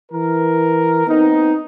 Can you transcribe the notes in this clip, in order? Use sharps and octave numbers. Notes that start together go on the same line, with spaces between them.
E3 A#4
B3 C4 D#4